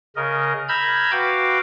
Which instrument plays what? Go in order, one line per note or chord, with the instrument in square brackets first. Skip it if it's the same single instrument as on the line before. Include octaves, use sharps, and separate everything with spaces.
[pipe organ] C#3 A#4 D#5
A#5 B5 E6 F6 G6 G#6
F#4 B4 F5 G5 D6